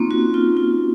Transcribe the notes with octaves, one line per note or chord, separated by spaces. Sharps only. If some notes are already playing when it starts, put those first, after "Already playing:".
Already playing: A#3 C4 C#4 D#4 F4
F#4
F4
F4